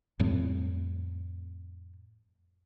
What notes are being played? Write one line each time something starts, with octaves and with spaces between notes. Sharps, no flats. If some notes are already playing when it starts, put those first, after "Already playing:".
F2 A2 G3 C4